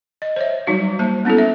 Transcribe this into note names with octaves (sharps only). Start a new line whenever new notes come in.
D#5
C5 C#5 E5
F#3 G3 D#4 F#4 F5
A#3 C5 A5
B3 C#4 E4 F#4 A4
E5